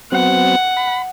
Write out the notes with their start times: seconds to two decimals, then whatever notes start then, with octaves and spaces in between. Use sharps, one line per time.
0.12 F#3 B3 C4 F#5
0.77 B5